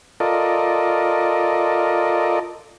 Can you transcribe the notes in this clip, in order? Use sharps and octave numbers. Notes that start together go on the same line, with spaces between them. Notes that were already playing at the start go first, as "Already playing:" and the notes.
F4 A4 A#4 D5 D#5